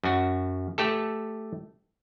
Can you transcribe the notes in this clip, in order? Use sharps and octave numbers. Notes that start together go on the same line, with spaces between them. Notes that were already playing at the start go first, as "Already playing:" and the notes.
F#2 F#4
A3 G4 A4